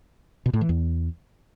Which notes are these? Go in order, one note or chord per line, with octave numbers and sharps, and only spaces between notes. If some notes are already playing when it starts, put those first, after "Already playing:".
B2
A2
E3
E2